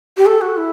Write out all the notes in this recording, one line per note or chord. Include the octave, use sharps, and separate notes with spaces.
G4
A4
F#4
E4